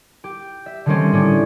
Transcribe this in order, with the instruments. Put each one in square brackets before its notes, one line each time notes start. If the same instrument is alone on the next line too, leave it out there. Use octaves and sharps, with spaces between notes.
[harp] G4
E5
D3 D#3 G3 A3 C4 C#4
A2 C#4 D4